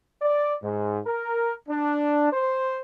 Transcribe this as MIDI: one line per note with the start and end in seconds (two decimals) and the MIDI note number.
0.22 0.55 74
0.63 1.00 44
1.06 1.53 70
1.69 2.30 62
2.33 2.80 72